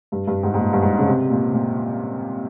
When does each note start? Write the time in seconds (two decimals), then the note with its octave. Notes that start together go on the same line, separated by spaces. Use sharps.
0.12 G2
0.27 G2
0.43 G#2
0.54 G#2
0.59 A#2
0.73 G2
0.82 G#2
0.99 C#3
1.07 C3
1.30 A#2
1.53 A#2